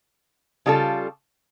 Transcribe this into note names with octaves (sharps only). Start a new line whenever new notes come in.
C#3 G3 D4 F4 A4